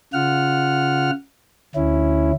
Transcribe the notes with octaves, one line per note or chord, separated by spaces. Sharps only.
C#3 F4 F#5 F6
D2 C#4 E4